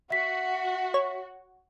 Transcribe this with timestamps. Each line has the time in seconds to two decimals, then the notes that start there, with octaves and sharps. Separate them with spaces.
0.10 F#4 E5 B6
0.94 C#5